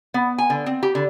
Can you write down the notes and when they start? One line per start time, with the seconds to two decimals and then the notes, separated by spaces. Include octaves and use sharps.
0.14 B3
0.38 G#5
0.50 D3
0.66 C4
0.83 G4
0.95 D3